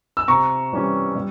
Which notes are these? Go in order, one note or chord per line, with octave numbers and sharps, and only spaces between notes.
E6
C3 A#5 C#6
E3 G3 C#4
G3